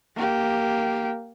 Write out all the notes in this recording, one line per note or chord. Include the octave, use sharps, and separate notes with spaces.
A#3 G4